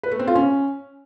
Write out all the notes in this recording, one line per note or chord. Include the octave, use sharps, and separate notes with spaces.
B4
A3
C4
F4
C#4